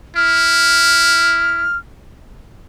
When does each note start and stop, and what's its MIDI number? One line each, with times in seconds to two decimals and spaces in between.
0.16 1.66 64
0.16 1.77 89